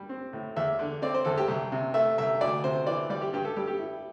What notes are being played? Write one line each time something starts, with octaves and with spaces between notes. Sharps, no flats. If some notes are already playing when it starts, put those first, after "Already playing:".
Already playing: G3
C4
A2
E2 E5
D3
C4 D5
C5
E2 A4
G4
C2
C3
A3 E5
C2 E5
D2 D5
C3 C5
E3 D5
G3 D5
G4
G2 G4
A4
G3 G4
G4
E4